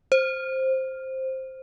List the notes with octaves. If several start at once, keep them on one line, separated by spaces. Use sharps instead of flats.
C5